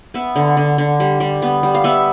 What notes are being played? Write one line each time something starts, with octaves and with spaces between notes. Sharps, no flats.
B3 E5
D3
D3
D3
G3
G3
B3
G3
F5
B3 E5